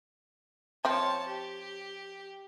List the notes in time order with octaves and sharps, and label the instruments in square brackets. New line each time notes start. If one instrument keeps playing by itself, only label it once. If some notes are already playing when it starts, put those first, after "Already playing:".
[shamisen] F3 C4 [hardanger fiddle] C#5 A5
[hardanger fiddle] G4